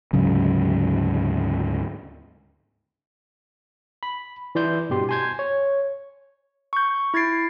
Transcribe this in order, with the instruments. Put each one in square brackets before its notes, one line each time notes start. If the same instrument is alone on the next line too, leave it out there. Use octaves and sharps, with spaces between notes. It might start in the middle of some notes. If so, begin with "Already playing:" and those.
[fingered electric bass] D2 G#2 C#3 F#3
[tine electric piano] B5
E3 E4 D5 C6 G6
G2 B2 G4 C6
G#5 A5 C6 G6 G#6
C#5
[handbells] C#6 G6
E4 G#6 A6 C7 D7